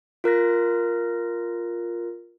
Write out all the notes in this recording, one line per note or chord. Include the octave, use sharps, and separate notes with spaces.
F4 A#4 F#6 A#6